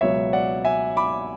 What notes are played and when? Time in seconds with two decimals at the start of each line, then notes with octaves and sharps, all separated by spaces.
0.01 C#2 B2 F#3 C#5 E5
0.33 D5 F#5
0.65 E5 G#5
0.97 B5 D6